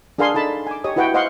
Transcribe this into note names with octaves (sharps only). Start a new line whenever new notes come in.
D4 G#4 A#4 F5 G#5 C6
D#4 A4 A5 B5
G#5 D6
G4 C#5 D#5 D#6
E4 F#4 B4 F#5 G5
C5 D#5 F5 F#5 C6 C#6